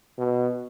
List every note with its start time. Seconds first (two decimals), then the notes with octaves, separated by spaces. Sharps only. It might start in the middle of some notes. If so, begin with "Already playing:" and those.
0.18 B2